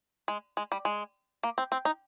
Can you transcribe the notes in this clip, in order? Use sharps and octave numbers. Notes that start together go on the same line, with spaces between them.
G#3
G#3
G3
G#3
A#3
C4
C4
D#4